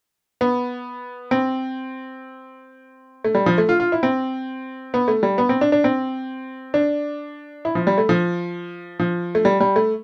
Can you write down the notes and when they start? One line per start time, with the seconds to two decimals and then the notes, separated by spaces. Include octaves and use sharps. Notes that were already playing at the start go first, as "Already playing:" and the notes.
0.41 B3
1.31 C4
3.24 A3
3.35 G3
3.46 F3
3.58 A3
3.69 F4
3.80 F4
3.92 E4
4.03 C4
4.94 B3
5.08 A3
5.23 G3
5.38 B3
5.49 C4
5.61 D4
5.72 D4
5.84 C4
6.74 D4
7.65 E4
7.75 F3
7.87 G3
7.98 A3
8.09 F3
8.99 F3
9.35 A3
9.45 G3
9.61 G3
9.76 A3